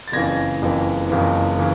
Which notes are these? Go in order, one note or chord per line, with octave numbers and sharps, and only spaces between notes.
A6
F#1 F2 C#3 E3 G#6 A#6
F#1 F2 C#3 E3
F#1 F2 C#3 E3
C#3 E3